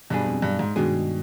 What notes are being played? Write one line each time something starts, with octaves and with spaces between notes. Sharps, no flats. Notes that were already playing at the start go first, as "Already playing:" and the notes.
B1 G2 B2 G3 D4 G#4
F2
G2
G#2
G2 B2 D#3 G#3 D4 G#4